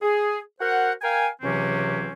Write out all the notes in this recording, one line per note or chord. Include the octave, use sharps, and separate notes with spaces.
G#4
F#4 A#4 C5 F#5
A#4 F5 G5 G#5
C#2 C3 E3 F#3 C4 C#4